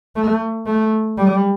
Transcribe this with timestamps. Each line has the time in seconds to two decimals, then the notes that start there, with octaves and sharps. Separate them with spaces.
0.16 A3
0.66 A3
1.18 G3